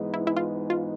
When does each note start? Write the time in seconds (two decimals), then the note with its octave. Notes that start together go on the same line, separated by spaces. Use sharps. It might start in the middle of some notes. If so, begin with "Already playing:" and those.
Already playing: G#2 E3 G#3 B3 D#4
0.14 E4
0.27 E4
0.37 F4
0.70 F4